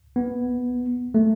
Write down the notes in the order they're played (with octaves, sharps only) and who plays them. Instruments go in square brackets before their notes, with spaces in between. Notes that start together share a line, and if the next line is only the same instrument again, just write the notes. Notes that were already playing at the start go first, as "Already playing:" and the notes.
[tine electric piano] B3
A3